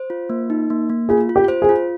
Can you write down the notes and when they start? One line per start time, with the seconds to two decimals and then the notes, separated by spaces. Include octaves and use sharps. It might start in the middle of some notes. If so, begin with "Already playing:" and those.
Already playing: C5
0.10 F4
0.30 A#3
0.50 D#4
0.70 A#3
0.90 A#3
1.09 F4 G#4
1.29 F4
1.36 G4
1.48 C5
1.62 G#4
1.69 F4